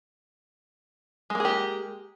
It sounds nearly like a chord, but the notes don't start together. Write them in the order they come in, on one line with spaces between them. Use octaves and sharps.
G#3 A#3 G#4 G4